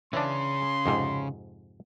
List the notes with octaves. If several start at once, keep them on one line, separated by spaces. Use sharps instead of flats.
C#3 E3 C#4 D4 C6
F2 G#2 C3